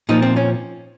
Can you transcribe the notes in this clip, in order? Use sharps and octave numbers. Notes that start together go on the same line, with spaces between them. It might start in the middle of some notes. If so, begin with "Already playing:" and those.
A#2 F3 D#4
C4
C#4